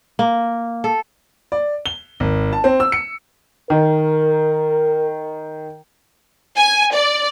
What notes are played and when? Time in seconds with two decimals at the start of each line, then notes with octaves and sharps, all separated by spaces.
0.19 A#3
0.84 A4
1.52 D5
1.86 G7
2.20 G#1
2.53 A5
2.64 C4
2.80 E6
2.92 C#7
3.70 D#3 A#4
6.57 G#5
6.94 D5